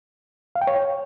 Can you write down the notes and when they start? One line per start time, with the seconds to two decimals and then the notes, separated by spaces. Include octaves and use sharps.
0.55 F5
0.61 G5
0.67 C#5